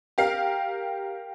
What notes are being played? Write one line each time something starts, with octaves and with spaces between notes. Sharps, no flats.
G4 A#4 F5 C7